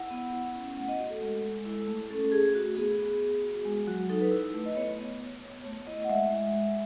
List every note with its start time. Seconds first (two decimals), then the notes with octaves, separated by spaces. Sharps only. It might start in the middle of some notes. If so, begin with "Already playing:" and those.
Already playing: E4 F#5
0.11 B3
0.33 E4
0.54 C#4
0.77 A3 F#5
0.88 D#5
0.99 F#4
1.10 A4
1.21 G#3
1.43 G#3
1.66 E4
1.88 A3
2.11 C#4 A4
2.32 A3 G#4
2.55 F#4
2.76 B3 G#4
2.99 B3
3.21 B3
3.43 F#4
3.65 G#3
3.87 F#3 F#4
4.09 D#4 A4
4.21 B4
4.31 E4
4.54 A3
4.66 D#5
4.75 B3 C#5
4.98 B3
5.20 B3
5.43 B3
5.64 A3 C#5
5.87 E4 D#5
6.04 F#5
6.09 G#3 E5
6.31 G#3
6.53 G#3